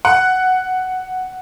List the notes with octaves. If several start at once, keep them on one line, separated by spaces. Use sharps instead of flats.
F#5